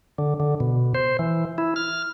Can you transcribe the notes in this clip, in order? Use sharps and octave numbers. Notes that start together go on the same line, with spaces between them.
D3
D3
B2
C5
E3
E4
F6